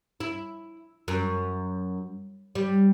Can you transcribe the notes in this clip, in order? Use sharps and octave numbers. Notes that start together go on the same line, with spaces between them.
E4
F#2
G3